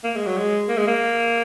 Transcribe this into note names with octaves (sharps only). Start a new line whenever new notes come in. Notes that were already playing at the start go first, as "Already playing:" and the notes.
A#3
G#3
F#3
G#3
A#3
G#3
A#3